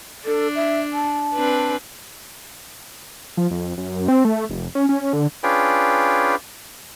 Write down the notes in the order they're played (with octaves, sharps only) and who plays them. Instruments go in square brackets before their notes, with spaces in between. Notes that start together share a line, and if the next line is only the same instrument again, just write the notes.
[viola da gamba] D4 [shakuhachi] A4
[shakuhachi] E5
A5
[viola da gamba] C4 D4 B4
[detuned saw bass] F3
F2
F#2
C4
A3
F1
C#4
C#4
D3
[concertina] C#4 D4 F4 G#4 B4 G5